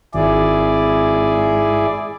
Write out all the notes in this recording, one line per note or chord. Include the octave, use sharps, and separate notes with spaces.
G#1 E4 G#4 D5